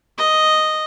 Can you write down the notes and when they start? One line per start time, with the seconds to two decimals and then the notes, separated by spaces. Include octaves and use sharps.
0.18 D#5